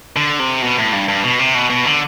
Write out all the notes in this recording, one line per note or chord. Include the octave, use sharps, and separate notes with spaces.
D3
C3
B2
A2
G2
G2
B2
C3
B2
B2
D3